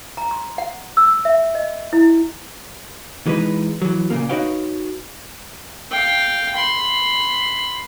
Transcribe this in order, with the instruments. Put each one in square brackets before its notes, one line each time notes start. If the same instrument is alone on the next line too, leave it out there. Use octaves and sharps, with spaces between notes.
[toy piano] A#5
C6
F#5
E6
E5
D#5
E4
[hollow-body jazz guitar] E3 G#3 D#4 B4
E3 F#3
A#2 C#3 A#3
D#4 F#4 B4 C#5 F5 G5
[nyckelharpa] F5 G5
B5 C6